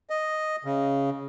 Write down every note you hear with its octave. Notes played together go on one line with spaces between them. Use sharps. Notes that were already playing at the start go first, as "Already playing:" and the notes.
D#5
C#3